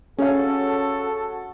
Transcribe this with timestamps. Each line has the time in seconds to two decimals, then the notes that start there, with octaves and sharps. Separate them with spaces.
0.18 C#4 F#4 G#4 A4 C#5 F5